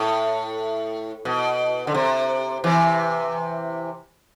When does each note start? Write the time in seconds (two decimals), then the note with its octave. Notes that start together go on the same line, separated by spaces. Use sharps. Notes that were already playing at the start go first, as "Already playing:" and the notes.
Already playing: A2
1.25 B2
1.87 D3
1.94 C3
2.64 C3 E3